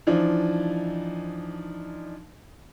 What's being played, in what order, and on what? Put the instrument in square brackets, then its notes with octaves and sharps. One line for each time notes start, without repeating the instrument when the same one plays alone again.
[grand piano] E3 F3 D4 D#4